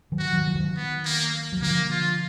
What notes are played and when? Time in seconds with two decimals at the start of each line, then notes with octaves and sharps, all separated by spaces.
0.12 D#3 F#3
0.19 F#4
0.33 D#3 F#3
0.48 F3
0.55 D#3 F#3
0.77 B3
1.05 A#3
1.53 F#3
1.62 D3 F3 A#3
1.91 F4